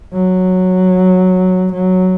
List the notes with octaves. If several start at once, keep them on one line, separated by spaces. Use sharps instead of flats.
F#3
F#3